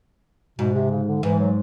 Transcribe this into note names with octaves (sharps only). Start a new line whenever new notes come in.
G#2 B2
C3
C#3
D3
G#2 E3
F#3